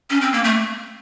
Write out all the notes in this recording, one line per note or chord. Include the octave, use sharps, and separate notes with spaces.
C#4
C4
A#3
A3